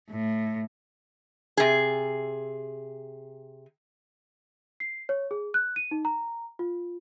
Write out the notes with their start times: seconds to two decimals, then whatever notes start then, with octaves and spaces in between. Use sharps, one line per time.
0.11 A2
1.57 C3 G#4
4.80 C7
5.09 C#5
5.31 G#4
5.54 F#6
5.76 D#7
5.91 D#4
6.05 A#5
6.59 F4